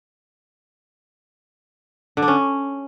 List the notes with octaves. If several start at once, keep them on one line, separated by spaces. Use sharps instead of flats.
D3
D4
C#4